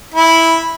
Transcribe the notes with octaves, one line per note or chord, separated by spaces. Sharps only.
E4